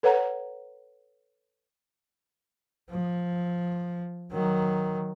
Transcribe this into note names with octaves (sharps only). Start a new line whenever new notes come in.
A4 B4 C#5 F#5 A#5
F3
D#3 F#3